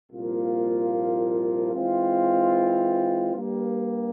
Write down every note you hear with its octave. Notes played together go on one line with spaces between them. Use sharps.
C2 A#2 F3 A#3 F4
E3 G#3 C4 F4
G2 G3 A#3